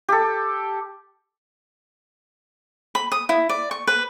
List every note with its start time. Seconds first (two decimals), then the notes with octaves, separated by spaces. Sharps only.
0.09 G4 A4
2.95 B5
3.12 D#6
3.29 E4
3.49 D5
3.71 C#6
3.87 B4